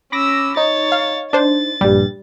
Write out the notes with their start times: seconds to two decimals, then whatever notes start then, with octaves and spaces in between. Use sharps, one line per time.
0.12 C#4 B5 D6 E6 A#6
0.57 D#4 C#5 A6
0.92 F5
1.33 D4 C5 A6
1.81 A#1 G2 G3